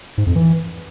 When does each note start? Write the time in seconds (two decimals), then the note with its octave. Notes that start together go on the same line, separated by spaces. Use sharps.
0.18 G#2
0.27 F2
0.35 E3